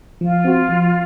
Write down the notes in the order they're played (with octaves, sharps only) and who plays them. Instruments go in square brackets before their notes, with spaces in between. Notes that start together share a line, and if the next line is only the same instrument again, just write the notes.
[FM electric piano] F3 [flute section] F4
[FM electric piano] C4 F#4
F3